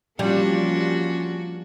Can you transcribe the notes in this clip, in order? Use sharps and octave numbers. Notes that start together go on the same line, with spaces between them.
F3 G3 A#3 C#4 D4 F4 F#4